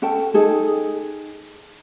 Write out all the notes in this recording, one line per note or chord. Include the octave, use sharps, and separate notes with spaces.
C#4 A4 G5 A5
D#4 G#4 A4